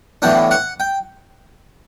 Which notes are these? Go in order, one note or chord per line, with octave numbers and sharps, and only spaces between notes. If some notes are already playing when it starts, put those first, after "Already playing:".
A2 E3 B3 D4 G5
F#5
G5